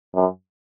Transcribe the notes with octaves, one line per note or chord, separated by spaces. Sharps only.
F#2